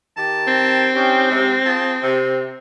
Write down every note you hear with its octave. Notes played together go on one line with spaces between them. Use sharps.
D#3 G4 A5
C4
C#4 D#4 G4
G#2 C3
F4 G#4 A5
C3